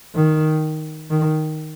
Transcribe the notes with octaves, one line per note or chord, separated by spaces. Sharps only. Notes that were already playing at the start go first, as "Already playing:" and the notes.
D#3
D#3